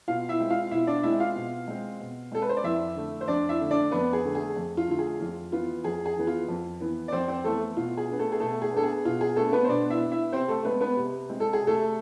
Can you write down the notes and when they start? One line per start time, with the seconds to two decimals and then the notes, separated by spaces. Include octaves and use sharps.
0.08 B2 F4 F5
0.29 E4 E5
0.40 G#3 C4
0.50 F4 F5
0.71 B2 E4 E5
0.87 D4 D5
1.03 G#3 C4 E4 E5
1.20 F4 F5
1.35 B2
1.67 G#3 C4
2.00 B2
2.31 G#3 C4 A4
2.42 B4
2.49 C5
2.57 D5
2.64 F2 E4 E5
2.96 D3 A3
3.21 C5
3.27 F2 D4 D5
3.49 E4 E5
3.61 D3 A3
3.71 D4 D5
3.91 F2 B3 B4
4.13 G#4
4.25 D3 A3
4.35 G#4
4.56 F2
4.77 F4
4.88 D3 A3 F4
4.99 G#4
5.20 F2 F4
5.52 E3 B3 F4
5.84 F2 G#4
6.05 G#4
6.16 E3 B3
6.27 F4
6.48 F2
6.80 E3 B3
7.08 D5
7.12 F2 C4 C5
7.28 C4 C5
7.44 E3 A3 B3 A4
7.77 B2 F4
7.97 G#4
8.08 B3 D4
8.19 A3 A4
8.32 G#4
8.40 B2 A3 A4
8.62 G#4
8.73 B3 D4 A4
8.83 G#4
9.05 B2 F4
9.21 G#4
9.36 A3 B3 D4 A4
9.52 B3 B4
9.64 C5
9.69 B2 D4 D5
9.90 E4 E5
10.00 B3 D4
10.12 E4 E5
10.32 C3 C4 C5
10.48 A3 A4
10.65 G#3 B3 C4 B4
10.81 B3 B4
10.97 C3
11.29 G#3 C4
11.40 A4
11.53 G#4
11.61 C3
11.67 A3 A4